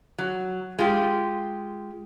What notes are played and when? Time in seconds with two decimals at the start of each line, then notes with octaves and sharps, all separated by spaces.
0.18 F#3
0.79 G#3 F4 G4